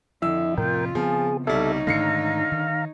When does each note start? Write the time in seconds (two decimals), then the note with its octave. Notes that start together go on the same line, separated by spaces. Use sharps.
0.22 F2 D3 E4 E6
0.57 A2 C3 F4 A#4 G5
0.95 C#3 F3 B3 C4 G#4
1.47 C2 G3 D#4 A4 C#5 E5
1.87 G#2 D3 D#3 A3 F5 A#5 C7 C#7
2.52 D#3